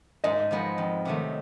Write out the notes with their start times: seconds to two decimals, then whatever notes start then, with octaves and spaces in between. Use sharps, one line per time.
0.24 G#2 D#5
0.51 F3 G#3 B3
0.78 F2
1.05 C3 D#3 F#3 A3